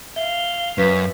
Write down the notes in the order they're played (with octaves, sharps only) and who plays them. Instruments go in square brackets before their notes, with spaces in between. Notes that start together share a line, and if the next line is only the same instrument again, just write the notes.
[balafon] E5 [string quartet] F5 [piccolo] G7
[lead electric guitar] F#2 [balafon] B4 [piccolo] B6